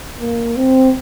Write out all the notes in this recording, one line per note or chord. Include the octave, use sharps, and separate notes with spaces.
A#3
C4